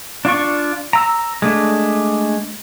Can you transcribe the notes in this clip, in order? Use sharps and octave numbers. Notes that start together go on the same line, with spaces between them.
D4 F4 D5 C#6
A#5 E6
G#3 A3 D4